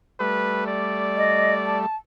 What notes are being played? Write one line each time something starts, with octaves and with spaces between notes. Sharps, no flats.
G3 A3 B4
D5
D#5
A5